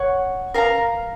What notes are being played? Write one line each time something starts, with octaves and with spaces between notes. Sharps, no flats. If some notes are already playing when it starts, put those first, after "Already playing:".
Already playing: C#5 F#5 C#6
A#4 F5 A#5